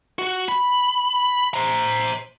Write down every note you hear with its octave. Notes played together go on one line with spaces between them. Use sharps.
F#4
B5
C5 A#5